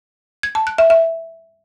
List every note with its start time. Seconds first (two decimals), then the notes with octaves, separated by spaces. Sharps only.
0.43 G#6
0.55 A5
0.67 F#6
0.78 E5
0.90 E5